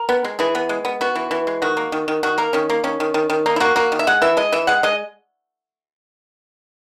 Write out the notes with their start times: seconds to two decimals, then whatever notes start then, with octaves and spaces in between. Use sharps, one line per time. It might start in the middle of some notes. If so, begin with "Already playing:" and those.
Already playing: A#4
0.09 B3
0.25 G#3
0.39 E3 G#4
0.55 B3
0.69 G#3
0.85 B3
1.01 B3 F#4
1.15 E3
1.31 E3
1.47 G#3
1.62 D#3 F#4
1.77 A#3
1.92 D#3
2.08 D#3
2.23 D#3 F#4
2.38 A#3 A#4
2.53 D#3 C#4
2.70 A#3
2.84 D#3 C#4
3.00 D#3
3.14 D#3
3.30 D#3
3.46 A#3 D#4
3.56 E4
3.60 A#3 F#4
3.76 A#3 F#4
3.92 D#3
3.99 E5
4.07 G#3 F#5
4.22 E3 E5
4.37 G#3 D#5
4.52 E3 E5
4.67 G#3 F#5
4.83 G#3 D#5